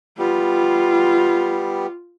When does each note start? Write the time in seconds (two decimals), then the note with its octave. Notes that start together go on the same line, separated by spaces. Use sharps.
0.19 G3 B3 F4 G4